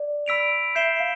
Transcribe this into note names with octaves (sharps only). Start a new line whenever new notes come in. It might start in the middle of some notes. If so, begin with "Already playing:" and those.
Already playing: D5
B5 E6 B6 D7 F7
E5 G6 C7 E7 G7
F5